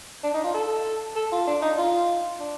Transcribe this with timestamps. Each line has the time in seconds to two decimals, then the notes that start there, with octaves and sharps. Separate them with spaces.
0.23 D4
0.34 D#4
0.44 F4
0.54 A4
1.15 A4
1.32 F4
1.47 D4
1.62 D#4
1.78 F4
2.40 D4